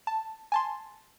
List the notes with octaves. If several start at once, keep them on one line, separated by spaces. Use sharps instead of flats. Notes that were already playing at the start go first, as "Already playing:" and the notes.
A5
G#5 A5 C6